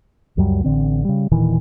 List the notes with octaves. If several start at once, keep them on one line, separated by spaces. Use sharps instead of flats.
C#2 F#2 F#3 G3
A1 D3 C4
C#3 G3
E1 A#2 D#3 E3